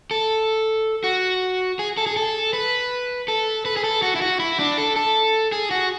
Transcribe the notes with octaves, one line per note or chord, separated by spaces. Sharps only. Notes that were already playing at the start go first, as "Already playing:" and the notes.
A4
F#4
G#4
A4
G#4
A4
B4
A4
B4
G#4
A4
F#4
E4
F#4
E4
D4
A4
A4
G#4
F#4